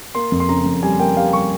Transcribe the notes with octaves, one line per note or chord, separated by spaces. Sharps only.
A#3 C6
F2
C6
C#3 A#5
F2
G3 G#5
A#3 G5
G3 F5
G3 C#6